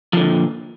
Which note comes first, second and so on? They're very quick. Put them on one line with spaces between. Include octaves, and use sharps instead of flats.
F3 D3 A#2